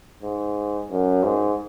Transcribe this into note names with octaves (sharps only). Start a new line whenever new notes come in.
G#2
F#2
G#2